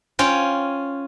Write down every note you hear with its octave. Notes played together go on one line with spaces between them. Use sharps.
C#4 F4 G5